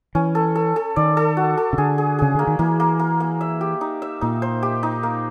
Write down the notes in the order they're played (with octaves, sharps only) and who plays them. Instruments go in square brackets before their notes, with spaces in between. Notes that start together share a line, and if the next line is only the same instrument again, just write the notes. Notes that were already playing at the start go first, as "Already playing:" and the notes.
[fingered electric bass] E3 [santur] C#4
[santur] A4
A4
A4
[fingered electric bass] D#3 [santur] D5
[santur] A4
F#4
A4
[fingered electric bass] C#3
[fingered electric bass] D3 [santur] G#4
[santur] G#4
[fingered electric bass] C#3 [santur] G#4
[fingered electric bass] D3 [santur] A#3
[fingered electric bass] D#3
[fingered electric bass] E3 [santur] A#3
[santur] A#3
A#3
A#3
E5
G4
D#4
E5
[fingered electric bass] A#2 [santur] D#4
[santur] C5
G4
D#4
A#3